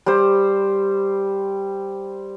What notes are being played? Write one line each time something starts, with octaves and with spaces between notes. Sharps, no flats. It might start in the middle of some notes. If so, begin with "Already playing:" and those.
G3 C5